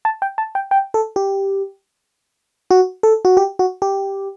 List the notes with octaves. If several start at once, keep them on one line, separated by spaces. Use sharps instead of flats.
A5
G5
A5
G5
G5
A4
G4
F#4
A4
F#4
G4
F#4
G4